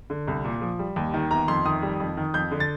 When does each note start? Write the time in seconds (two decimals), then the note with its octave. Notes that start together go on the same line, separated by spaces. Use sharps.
0.10 D3
0.28 C2
0.45 A#2
0.61 F3
0.79 G3
0.96 D#2
1.14 D#3
1.31 G1 A#5
1.48 F2 C6
1.65 D#3 D#6
1.83 G3
2.00 F2
2.17 D#3
2.34 F2 G6
2.51 D3
2.60 A6